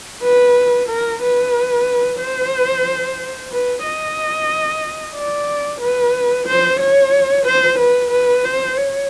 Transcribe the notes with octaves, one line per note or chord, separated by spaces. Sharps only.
B4
A#4
B4
C5
B4
D#5
D5
B4
C5
C#5
C5
B4
B4
C5
C#5